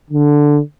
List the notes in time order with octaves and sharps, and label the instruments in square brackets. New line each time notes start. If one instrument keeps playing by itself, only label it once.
[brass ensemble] D3